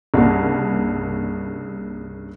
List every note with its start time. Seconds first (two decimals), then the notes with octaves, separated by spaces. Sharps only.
0.14 C2 G2 C#3 A#3